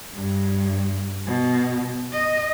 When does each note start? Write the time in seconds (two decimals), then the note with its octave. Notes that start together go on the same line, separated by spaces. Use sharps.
0.14 G2
1.27 B2
2.13 D#5